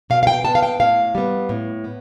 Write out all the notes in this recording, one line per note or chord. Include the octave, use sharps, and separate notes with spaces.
B2 F5
F5
G5
B3 A5
F5
G5
A2 F5
G3 B3
A2
B3